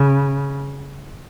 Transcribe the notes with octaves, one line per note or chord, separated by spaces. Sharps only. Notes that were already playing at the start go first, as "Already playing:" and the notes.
Already playing: C#3